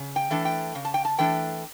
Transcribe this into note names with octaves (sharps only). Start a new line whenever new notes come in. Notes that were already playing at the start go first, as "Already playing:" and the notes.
Already playing: C#3
G5
E3 A3 D4
G5
C#3
A5
G5
A5
E3 A3 D4 G5